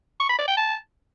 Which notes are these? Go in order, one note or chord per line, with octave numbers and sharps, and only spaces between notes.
C#6
B5
D5
G5
A5